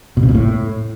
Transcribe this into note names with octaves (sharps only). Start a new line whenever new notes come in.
B2
C3
A#2
A2